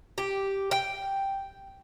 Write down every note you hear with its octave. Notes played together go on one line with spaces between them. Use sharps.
G4
G5